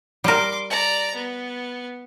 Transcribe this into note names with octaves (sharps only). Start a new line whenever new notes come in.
G3 A#4 C6 D6
D5 A#5
B3